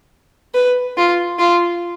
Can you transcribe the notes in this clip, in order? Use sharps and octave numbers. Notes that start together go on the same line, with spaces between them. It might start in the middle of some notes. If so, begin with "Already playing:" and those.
B4
F4
F4